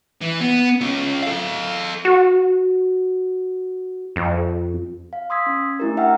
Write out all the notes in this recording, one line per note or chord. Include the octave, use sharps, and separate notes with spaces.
E3
B3
C#4 F4
A4 F5
F#4
F2
F5
C6 D#6 E6 G#6 B6
C#4
A3 D4 E4 G4 A#4
E5 F#5 G5 A#5 E6 F6